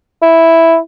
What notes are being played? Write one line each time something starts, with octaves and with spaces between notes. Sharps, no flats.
E4